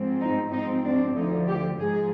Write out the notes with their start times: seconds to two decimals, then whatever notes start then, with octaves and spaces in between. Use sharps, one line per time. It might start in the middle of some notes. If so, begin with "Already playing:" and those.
Already playing: G#2 F3 C4
0.20 D#4
0.52 G#2 F3 C4 D#4
0.85 D4
1.16 D2 D3 F3 D#4
1.47 G4
1.79 G#2 F3 G#3 G#4